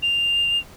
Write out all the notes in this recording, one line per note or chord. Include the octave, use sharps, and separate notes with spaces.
F7